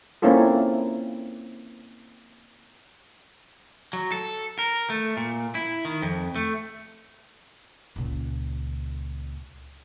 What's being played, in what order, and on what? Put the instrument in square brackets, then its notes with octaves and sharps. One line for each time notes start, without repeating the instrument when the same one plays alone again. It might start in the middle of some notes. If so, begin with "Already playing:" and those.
[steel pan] A#3 C4 C#4 E4 F4 A4
[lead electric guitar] F#3
A4
A#4
A3
A#2
E4
D#3
F2
A3
[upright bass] C#2 A#2